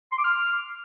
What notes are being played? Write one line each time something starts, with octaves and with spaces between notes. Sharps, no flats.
C6
D6
F6